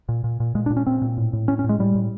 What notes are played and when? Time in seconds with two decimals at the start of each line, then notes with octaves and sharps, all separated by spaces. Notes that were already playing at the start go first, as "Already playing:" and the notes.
0.09 A#2
0.24 A#2
0.40 A#2
0.55 A#2 G#3
0.66 D4
0.70 A#2
0.77 C#4
0.87 A#2 C4
1.02 A#2
1.17 A2
1.33 A2
1.48 A2 C#4
1.59 C#4
1.64 A2
1.69 G#3
1.79 A2 G3
1.95 A2